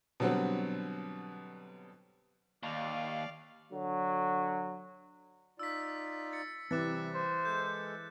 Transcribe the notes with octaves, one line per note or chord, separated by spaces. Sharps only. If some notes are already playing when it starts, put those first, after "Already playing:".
B2 D3 F#3 G3 B3 C4
D#2 D5 F5
D3 F#3
D#4 F4 D5 E6 B6
A6 C#7
C3 E3 G3 C4 D6 F#6 A6
C5
G#3 A4 G6